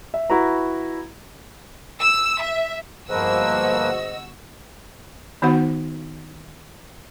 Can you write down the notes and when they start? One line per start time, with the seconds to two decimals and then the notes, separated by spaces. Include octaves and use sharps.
0.14 E5
0.30 E4 F#4 B4 A#5
1.99 E6
2.41 E5
3.09 G1 G#2 F3 A#3 F#4 B4 D#5 E6
5.42 D#3 B3 D#4 F#4 C5 F#5